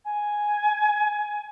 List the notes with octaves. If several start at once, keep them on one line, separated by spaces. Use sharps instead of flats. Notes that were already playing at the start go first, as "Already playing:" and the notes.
G#5